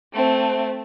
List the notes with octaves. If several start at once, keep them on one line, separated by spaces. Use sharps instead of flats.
A3 C4